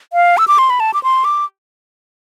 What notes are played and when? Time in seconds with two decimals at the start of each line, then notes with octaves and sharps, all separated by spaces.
0.13 F5
0.38 E6
0.48 D6
0.58 C6
0.70 B5
0.80 A5
0.94 D6
1.03 C6
1.24 D6